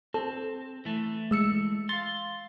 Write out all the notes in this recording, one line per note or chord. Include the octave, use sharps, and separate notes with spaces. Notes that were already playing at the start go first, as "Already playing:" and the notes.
C4 A4
E3 A3
G#3 E6 C#7
F5 C6 A6